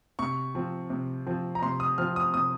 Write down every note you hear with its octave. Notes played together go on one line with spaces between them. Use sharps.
C3 C#6
F3 C4
C3
F3 C4
A#5
C3 C6
D#6
F3 C4 F6
D#6
C3 D#6